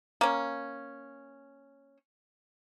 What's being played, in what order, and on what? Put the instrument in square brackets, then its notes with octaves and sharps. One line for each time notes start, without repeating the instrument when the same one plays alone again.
[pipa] A#3 C#4